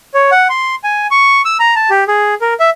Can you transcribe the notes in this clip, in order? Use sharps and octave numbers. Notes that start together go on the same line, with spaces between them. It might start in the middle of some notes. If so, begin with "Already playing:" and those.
C#5
F#5
C6
G#5
C#6
E6
A#5
A5
G4
G#4
A#4
E5